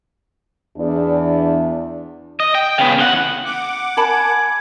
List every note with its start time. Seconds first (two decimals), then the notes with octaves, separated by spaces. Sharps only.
0.77 E2 D4
2.40 D#5
2.55 G5
2.78 C#3 B3
2.99 E2 F#5
3.45 F#5 D6
3.97 A#4 G#5 A5 B5